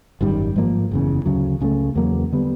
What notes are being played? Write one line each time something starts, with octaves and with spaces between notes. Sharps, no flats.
G#1 F#2 D#3 G3
G#2 F3 A#3
F#1 E2 C#3
D2 C#3 F#3
C#2 C#3 F#3 A3
E2 C#3 F#3 A#3
D3 G3 B3